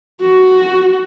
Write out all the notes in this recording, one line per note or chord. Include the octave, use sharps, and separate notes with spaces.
F#4